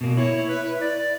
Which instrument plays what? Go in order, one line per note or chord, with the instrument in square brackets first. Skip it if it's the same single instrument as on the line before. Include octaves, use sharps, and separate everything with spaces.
[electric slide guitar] B2 A#3
[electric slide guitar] E4 [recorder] C#5
[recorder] B4
D5